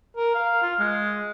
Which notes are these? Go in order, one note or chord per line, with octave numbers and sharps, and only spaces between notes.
A#4
F5
F4
G#3